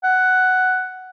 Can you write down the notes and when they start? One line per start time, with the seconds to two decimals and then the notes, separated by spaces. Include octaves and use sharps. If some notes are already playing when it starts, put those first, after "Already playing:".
0.04 F#5